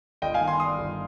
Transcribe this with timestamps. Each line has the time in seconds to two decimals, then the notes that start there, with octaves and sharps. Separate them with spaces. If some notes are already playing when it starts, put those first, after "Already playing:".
0.22 G1 D#5 G5
0.34 F5 G#5
0.41 D#3
0.47 G#5 C6
0.60 G2 C6 D#6
0.79 G1